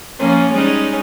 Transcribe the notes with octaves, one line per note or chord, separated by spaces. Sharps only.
F3 A#3 C#4
G3 G#3 C#4 D#4